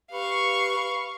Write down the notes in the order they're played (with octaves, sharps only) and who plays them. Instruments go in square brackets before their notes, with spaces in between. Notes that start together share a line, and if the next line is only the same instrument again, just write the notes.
[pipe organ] G4 B4 B5 [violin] F5 C#6